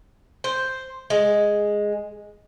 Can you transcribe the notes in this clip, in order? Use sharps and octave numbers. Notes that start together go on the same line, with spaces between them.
C5
G#3